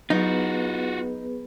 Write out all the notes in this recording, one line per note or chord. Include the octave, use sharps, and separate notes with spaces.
F#3 B3 D#4 F4 F#4 G#4 B4